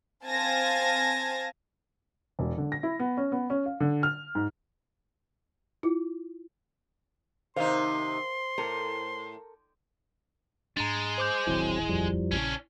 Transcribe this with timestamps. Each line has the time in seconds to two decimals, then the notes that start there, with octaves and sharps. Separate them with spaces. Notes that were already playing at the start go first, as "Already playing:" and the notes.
0.25 C4 F5 G#5 A5 G#6 A#6
2.39 E1
2.58 D3
2.72 A#6
2.83 E4
3.00 B3
3.17 C#4
3.32 B3
3.50 C#4
3.66 F5
3.80 D3
4.03 F6
4.35 G#2
5.83 E4 F4
7.56 D#2 C3 D#4 A#4 C5 F5 C6
8.58 A2 A4 A#4
10.77 G#2 G#3 D4 A#5 A6
11.18 C5 D6 G6
11.47 D#1 A1 D#3 F#3 C4 E4
11.89 F2 F3 G3
12.31 A#1 C#3 C#4 D4